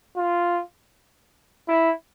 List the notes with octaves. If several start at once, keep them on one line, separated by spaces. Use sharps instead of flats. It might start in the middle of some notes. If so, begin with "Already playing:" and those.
F4
E4